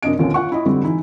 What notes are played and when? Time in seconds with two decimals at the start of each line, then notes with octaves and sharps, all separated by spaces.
0.03 F#2 C3 D4 D#5 D7
0.19 D#2 A#2 D3 C4 C#4
0.34 F4 F#5 C#6
0.52 E4 D#5
0.65 F2 D3 G3 C4
0.83 E3 D#4 E4